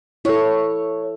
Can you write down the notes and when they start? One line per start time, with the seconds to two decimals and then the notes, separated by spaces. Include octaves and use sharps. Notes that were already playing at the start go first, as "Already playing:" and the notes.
0.25 E4 A4 C#5